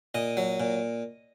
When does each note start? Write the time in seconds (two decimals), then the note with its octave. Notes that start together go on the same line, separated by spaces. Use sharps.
0.15 A#2 D#5
0.37 F#3
0.60 A#2